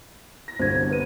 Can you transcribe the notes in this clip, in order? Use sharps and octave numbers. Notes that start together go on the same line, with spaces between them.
A#6
G1 C2 D3 C5 G#6
B4 D#7